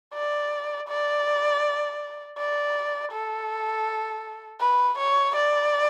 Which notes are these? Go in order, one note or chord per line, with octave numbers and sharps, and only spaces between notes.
D5
D5
D5
A4
B4
C#5
D5